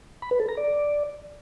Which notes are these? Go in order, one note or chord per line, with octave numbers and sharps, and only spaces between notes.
B5
B4
A4
A#5
D5